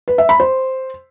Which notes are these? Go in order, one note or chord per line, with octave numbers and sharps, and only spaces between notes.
B4
E5
B5
C5